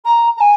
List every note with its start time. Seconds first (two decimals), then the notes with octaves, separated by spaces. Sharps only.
0.04 A#5
0.36 A#5
0.40 G#5